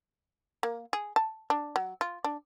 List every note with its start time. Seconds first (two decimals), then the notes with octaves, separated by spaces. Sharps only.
0.63 A#3
0.93 G#4
1.16 A5
1.50 D4
1.76 F#3
2.01 F4
2.24 D4